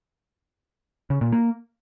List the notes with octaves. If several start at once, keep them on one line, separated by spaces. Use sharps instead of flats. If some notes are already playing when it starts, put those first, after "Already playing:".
C#3
A#2
A#3